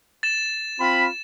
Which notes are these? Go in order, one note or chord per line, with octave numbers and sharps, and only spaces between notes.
A6 E7
C4 F4 B5